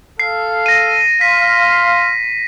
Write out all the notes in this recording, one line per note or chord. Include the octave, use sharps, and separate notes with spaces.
A4 F5 C7
A#6 D#7
F5 C6 B6